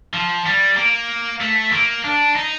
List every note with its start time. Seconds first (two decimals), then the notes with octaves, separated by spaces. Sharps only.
0.14 F3
0.46 G3
0.77 A#3
1.41 A3
1.72 A#3
2.04 D4
2.35 D#4